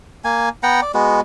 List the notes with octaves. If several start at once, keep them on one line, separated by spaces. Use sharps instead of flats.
A#3 G#5
B3 F#5 G5 A#5
D5
G#3 B3 F#4